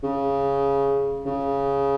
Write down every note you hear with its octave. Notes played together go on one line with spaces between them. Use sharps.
C#3
C#3